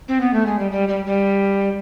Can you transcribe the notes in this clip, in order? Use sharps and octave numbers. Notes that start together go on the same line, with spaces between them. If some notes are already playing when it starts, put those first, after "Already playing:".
C4
B3
A3
G#3
G3
G3
G3
G3